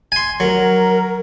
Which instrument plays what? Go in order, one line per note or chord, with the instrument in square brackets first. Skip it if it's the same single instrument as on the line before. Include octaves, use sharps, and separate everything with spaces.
[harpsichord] G#5 C6
[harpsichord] F#3 [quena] A#4